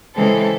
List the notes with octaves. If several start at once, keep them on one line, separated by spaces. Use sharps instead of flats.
C#3 E3 G#3 C4 A4